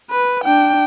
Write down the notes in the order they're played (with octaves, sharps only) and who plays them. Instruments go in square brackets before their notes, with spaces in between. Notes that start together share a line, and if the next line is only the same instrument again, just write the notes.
[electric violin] B4
D4 G5